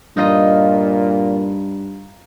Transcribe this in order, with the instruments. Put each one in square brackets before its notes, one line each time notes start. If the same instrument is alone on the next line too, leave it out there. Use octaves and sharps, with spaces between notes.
[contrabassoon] G2 [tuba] A#2 [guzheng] D#4 F4 D#5